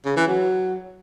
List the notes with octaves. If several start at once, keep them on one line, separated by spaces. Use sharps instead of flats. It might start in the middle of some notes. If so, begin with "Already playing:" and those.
C#3
E3
F#3